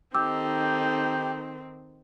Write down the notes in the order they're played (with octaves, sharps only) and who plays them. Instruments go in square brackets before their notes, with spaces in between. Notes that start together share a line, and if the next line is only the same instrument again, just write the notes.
[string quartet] D#3 C4 [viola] D#4 A4 [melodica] G4 [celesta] D6 E6